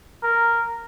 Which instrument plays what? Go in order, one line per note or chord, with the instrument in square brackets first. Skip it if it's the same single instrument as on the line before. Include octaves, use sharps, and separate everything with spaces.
[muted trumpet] A#4